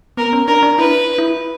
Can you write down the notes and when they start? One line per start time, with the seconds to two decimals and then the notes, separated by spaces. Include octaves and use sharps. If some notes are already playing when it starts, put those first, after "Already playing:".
0.17 B3 A#4
0.33 C#4
0.47 D4 A#4
0.63 D4
0.78 E4 B4
1.18 E4